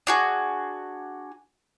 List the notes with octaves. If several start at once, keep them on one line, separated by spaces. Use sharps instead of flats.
D4 F#4 G#4